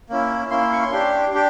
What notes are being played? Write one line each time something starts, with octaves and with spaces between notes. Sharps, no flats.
A#3 C#4 E4
A#3 C#4 E4 C6
C6
C#6
C6
D4 G4
D4 G4